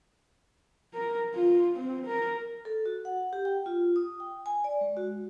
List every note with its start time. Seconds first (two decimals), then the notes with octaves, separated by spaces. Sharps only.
0.94 A#4
1.35 F4
1.76 C4
2.06 A#4
2.65 A4
2.86 F#4
3.05 F#5
3.33 G4
3.45 G5
3.66 F4
3.96 D#6
4.20 G5
4.46 G#5
4.64 D5
4.81 G#3
4.97 F#4